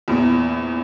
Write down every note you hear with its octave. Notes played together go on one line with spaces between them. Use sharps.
A#1 E2